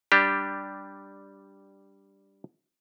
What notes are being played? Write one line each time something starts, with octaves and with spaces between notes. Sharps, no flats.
G3 D4 G4